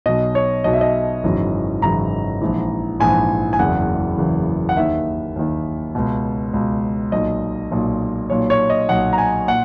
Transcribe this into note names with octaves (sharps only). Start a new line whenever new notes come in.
B1 B2 D#5
C#5
B1 B2 D#5
E5
D#5
G#1 F#2 C#3 E3
G#1 F#2 C#3 E3 A#5
A#1 G#2 E3
A#1 G#2 E3 G#5
G#5
F#1 E2 C#3 E3 F#5
F#1 E2 C#3 E3
F#5
D#2 D#3 E5
D#2 D#3
C#2 B2
C#2 B2
B1 A#2 D#5
B1 A#2
B1 A#2 C#5
C#5
D#5
B1 A#2 F#5
A#5
G#5
A#2 F#5